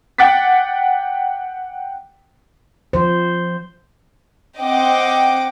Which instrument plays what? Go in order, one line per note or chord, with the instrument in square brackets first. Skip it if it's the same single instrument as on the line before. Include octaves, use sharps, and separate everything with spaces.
[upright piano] F#5 G5 D6 A6 B6
[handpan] F3 C5
[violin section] C4 D#5 F#5 G5 D6